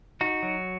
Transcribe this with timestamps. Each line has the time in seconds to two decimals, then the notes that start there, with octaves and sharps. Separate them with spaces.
0.21 D#4 F#4
0.43 F#3